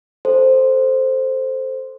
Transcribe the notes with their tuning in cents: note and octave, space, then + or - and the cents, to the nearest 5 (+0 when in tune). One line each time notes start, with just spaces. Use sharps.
A4 +0 C5 +0